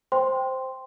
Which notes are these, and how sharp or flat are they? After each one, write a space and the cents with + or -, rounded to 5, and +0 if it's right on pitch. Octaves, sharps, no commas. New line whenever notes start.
C5 +0 G5 +0 C6 -5